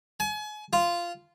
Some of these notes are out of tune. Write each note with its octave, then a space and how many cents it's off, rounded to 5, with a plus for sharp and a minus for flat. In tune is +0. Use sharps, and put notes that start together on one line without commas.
G#5 +35
F4 -10